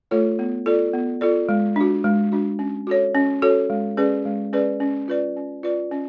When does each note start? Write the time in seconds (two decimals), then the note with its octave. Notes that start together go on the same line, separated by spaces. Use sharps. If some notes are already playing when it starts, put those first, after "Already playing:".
0.11 A3 F4 A4 C#5
0.39 B3
0.66 F4 A4 D5
0.94 B3
1.21 F4 A4 D5
1.49 G#3
1.76 D4 F#4
2.04 G#3
2.32 D4 F#4
2.59 C#4
2.87 F#4 A4 C#5
3.15 C#4
3.42 F#4 A4 C#5
3.70 G#3
3.97 C#4 G#4 B4 D5
4.25 G#3
4.53 C#4 G#4 B4 D5
4.80 C#4
5.08 F4 B4 D5
5.36 C#4
5.63 F4 B4 D5
5.92 C#4